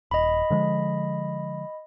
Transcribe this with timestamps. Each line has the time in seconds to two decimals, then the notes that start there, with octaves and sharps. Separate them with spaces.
0.11 D#1 D#5 B5
0.50 D3 F3 G#3